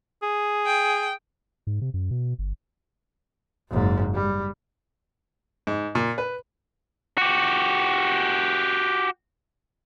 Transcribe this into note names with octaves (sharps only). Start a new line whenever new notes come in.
G#4
G5
G#2
C3
F#2
B2
G1
F#1 G#2
G3
G#2
A#2
B4
F#4 G4